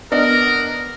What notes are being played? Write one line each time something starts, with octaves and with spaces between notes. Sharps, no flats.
B3 D4 A#4 D#5